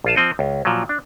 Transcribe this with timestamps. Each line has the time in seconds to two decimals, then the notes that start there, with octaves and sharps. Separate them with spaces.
0.04 A#1 F4 A5
0.16 F3 C4 D#5
0.39 C#2
0.65 A#2 F3 F#3
0.89 D4